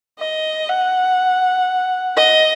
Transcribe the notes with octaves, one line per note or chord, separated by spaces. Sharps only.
D#5
F#5
D#5